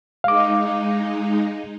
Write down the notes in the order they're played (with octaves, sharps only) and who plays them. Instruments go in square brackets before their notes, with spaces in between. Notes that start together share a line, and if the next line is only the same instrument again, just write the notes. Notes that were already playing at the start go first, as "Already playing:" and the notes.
[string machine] G#3 D#4 [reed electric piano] F5 D6